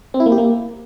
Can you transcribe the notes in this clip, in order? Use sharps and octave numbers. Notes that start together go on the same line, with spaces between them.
C4
E4
A#3
G4
A#3